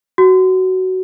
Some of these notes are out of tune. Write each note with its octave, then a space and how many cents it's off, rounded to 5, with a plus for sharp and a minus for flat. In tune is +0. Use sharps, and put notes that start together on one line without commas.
F#4 +15